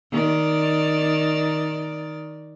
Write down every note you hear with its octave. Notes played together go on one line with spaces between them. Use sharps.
D#3 D5